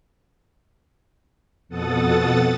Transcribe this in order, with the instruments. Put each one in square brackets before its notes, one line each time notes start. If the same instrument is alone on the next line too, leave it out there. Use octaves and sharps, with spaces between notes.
[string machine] F2 B2 A4 F#5 D#6 A6